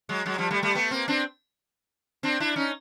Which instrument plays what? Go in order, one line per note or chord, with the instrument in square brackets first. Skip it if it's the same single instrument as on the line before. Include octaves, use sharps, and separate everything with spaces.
[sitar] F#3 G#3
F#3 G#3
F3 G3
G3 A3
G3 A3
A3 B3
A#3 C4
C4 D4
C4 D4
D4 E4
C#4 D#4